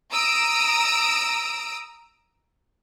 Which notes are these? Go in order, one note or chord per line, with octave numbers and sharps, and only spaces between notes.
A#5 D#6 E6 D7